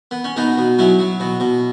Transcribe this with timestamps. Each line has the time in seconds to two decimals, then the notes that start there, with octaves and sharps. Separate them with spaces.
0.11 B3
0.24 C#4
0.36 B2 B3 D#4
0.58 B2
0.79 F#3 C#4 E4
0.99 F#3
1.20 B2
1.40 B2